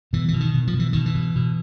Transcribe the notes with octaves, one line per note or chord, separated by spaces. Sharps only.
B2 E3
B2 E3
D#3
B2
F3
B2
E3
B2 D#3
E3
B2
B2